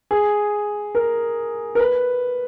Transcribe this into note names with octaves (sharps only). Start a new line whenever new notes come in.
G#4
A#4
A#4
B4